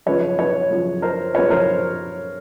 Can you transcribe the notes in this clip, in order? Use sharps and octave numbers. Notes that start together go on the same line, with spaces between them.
F#2 C#3 F3 B4 C#5
B4 C#5
F#2 C#3 F3
A#4 C5
F#2 C#3 F3 B4 C#5
A#4 C5